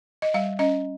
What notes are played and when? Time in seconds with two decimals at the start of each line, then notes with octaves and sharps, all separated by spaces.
0.22 D#5
0.34 G3 F5
0.59 C#4 D#5